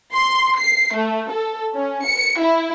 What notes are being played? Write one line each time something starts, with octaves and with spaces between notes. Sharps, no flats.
C6
C7
A3
A4
C#4
C#7
E4